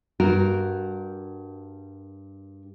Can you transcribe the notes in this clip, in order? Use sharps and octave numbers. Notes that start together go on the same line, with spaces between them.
G2 G3 F#4 A#4